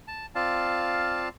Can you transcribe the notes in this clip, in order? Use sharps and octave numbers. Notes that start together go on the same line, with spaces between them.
A5
C4 F4 D5 F5 A5